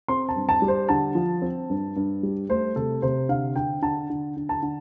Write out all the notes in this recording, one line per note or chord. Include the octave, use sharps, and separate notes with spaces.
C4 C6
A5
G2
A5
G3
C5
D3 A5
F3
C4
G2
G2
G3
A3 C5
C3 A4
C3 C5
D3 F5
D3 G5
D3 A5
D3
D3
A5
D3